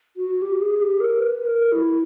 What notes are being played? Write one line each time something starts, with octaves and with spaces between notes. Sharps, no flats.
F#4
G4
G#4
G4
A#4
B4
A#4
E4